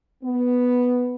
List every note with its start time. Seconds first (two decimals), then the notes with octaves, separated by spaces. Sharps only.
0.23 B3